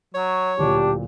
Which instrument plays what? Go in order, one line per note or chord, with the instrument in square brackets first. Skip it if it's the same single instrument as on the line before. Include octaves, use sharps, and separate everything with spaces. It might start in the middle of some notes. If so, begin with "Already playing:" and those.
[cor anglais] F#3 [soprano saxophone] C#5
[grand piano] D1 A#2 [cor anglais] D4 [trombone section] G4